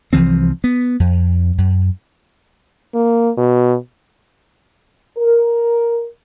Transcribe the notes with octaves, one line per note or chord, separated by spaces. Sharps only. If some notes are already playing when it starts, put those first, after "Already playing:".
C2 E3 F3 C4
B3
F2
F#2
A#3
B2
A#4